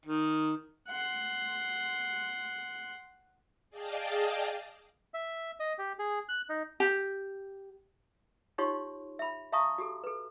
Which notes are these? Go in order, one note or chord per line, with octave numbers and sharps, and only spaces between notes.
D#3
F#5 C6
G#4 D5 D#5 F5 G5 A5
E5
D#5
G4
G#4
F#6
D#4
G4
D#4 F4 G4 C#5 C6 C#6
E5 B5
E5 F5 A5 A#5 C#6 D#6
F#4 G4 A4
A4 B4